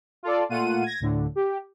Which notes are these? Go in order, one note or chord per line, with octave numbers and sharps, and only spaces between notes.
F4 A4 D5
A#2 A3 F4 F#5 D#7
G#6 A#6
D2 A2 D3
G4